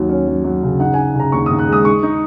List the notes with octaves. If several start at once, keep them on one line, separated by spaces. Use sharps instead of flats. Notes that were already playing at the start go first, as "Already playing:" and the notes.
Already playing: D#2 F#3
C#4
F#3
F#3
C#3
D#4 F#5
D#4 G#5
C#3 A#5
D#2 C#6
D#2 D#6
F#6
G#3 D#6
D#4 C#6
D#4